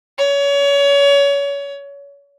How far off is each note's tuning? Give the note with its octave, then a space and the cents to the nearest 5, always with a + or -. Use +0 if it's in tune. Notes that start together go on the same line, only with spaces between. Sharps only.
C#5 +30